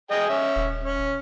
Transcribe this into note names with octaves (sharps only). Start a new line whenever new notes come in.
G#4 D#5 G5
C#4 E5
D#1
C#4